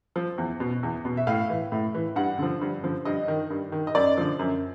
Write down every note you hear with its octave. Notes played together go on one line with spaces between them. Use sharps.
F3
E2
B2
E2
B2
E5
A2 F5
E3
A2
E3
G2 F#5
D3 F3
G2
D3 F3
G2 D#5
D#3
G2
D#3
D#5
F#2 D5
D3 F3
F#2